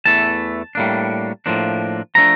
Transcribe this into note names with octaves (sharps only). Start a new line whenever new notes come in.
E2 E3 A3 A5
A2 G3 A#3 D4
A2 F3 A#3 D4
F3 A3 D4 A#5